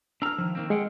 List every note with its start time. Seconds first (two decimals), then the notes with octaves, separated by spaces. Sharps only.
0.22 D4 A#5 E6 F6
0.38 D#3 F3
0.55 D#3 A#3 C4
0.70 G#3 G#4 F#5 G5